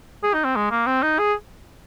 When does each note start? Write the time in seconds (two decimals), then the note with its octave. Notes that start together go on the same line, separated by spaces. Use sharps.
0.24 G#4
0.34 D#4
0.44 C4
0.56 G#3
0.71 A#3
0.87 C4
1.03 D#4
1.19 G#4